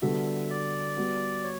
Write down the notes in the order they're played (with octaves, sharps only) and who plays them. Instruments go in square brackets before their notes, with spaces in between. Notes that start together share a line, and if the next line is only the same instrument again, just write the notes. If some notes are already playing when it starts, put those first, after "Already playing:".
[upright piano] D3 G3 B3 F#4 A4 [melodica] E5
[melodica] D5
[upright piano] G3 B3 F#4
[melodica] C#5